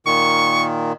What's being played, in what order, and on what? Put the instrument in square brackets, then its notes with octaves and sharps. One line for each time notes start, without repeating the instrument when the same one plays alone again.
[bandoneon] A#2 D#3 [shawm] C#6